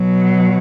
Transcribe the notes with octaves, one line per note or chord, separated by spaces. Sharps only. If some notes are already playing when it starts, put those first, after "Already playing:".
Already playing: B2 F#3